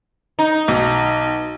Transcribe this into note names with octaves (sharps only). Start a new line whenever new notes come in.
D#4
B1